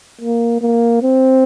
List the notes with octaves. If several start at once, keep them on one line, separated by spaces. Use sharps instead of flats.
A#3
A#3
C4